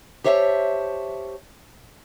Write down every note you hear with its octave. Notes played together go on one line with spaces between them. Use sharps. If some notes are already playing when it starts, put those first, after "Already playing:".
G4 C5 C#5 E5 G5 A5